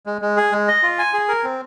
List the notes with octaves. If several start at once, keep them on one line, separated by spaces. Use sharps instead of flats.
G#3
G#3
G#4
G#3
D#5
F4
G#5
G#4
A#4
C4